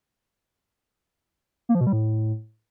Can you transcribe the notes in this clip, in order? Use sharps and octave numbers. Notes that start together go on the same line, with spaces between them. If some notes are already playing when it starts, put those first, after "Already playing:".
A#3
F3
B2
G3
A2